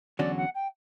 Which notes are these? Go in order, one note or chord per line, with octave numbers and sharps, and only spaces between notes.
E2 D3 F#3 C#4 F#4 D5
F#5
G5